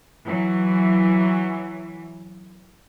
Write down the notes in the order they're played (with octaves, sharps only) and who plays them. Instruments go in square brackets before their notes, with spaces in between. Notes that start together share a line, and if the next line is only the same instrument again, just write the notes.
[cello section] E3 F#3